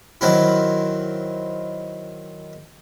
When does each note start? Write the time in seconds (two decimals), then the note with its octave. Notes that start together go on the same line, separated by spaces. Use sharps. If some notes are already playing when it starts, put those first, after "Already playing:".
0.21 D#3 F#3 C4 E4